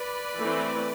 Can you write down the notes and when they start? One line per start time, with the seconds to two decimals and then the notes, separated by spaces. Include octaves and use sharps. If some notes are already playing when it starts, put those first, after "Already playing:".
Already playing: B4 D5
0.38 E3 A3 C4